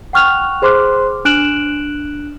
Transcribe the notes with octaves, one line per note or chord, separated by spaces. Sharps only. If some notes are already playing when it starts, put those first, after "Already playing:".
F#5 G5 C#6 F6 F#6 F7
G#4 C5 C6 D6 F6 F#6
D4 F6 F#6 D7 E7 F#7